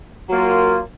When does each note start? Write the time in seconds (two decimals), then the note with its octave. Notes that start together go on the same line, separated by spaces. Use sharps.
0.29 F#3 A#3 F4